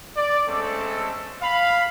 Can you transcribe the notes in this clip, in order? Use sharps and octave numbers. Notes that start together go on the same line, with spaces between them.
D5
G#3 A3 C4 C#4 A4
F5 B5